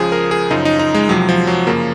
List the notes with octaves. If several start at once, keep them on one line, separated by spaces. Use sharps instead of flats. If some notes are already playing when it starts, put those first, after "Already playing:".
Already playing: C#2 C#3 F3 G#4
A#4
G#4
F#2 C#3 F3 D#4
D#4
D#4
G#3
F2 C3 F3 F#3
F3
F#3
F#2 C#3 F3 A#3